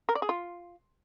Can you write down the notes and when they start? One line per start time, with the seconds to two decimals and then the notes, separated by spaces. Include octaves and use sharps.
0.09 A#4
0.15 D5
0.22 G#4
0.29 F4